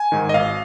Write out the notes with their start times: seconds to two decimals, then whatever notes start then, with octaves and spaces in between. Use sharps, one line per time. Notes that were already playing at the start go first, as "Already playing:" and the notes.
Already playing: G#5
0.12 G#2 D#3
0.29 D#5
0.34 G#1 F5